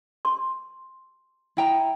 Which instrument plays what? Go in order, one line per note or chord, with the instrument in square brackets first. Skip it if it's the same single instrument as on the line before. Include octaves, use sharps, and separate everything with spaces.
[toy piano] C6
[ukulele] E4 G5 A#5